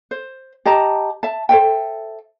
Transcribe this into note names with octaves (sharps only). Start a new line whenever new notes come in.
C5
G4 D#5 A5 A#5
E5 A5
A4 C5 E5 G5